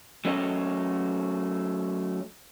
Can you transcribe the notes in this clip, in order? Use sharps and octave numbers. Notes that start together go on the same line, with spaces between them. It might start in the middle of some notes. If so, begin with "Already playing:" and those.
F#3 A3 C#4 A4 C#5 D#5